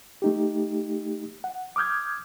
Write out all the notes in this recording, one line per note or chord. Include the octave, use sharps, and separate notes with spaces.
A3 D#4 G4
F#5
D6 D#6 F6 G6 G#6